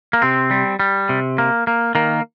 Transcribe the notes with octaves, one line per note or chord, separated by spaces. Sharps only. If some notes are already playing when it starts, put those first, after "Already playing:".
A#3
C3 C4
G3
G3
C3
A#3
A#3
D#3 A#3